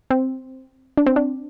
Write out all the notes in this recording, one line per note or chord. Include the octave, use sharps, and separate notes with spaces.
C4
D4
C4
D4